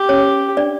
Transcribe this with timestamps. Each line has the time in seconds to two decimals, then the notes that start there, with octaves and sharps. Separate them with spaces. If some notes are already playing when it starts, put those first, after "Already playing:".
Already playing: G4
0.09 C#4 C#5
0.57 D4 D5